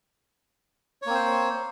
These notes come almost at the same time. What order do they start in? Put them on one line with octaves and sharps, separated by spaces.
C#5 A#3 C4 C5